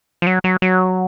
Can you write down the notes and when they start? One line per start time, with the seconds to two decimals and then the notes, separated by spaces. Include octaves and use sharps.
0.22 F3
0.27 F#3
0.44 F#3
0.62 F#3